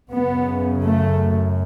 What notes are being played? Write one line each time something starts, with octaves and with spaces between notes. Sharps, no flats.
F#2 C#3 B3
A3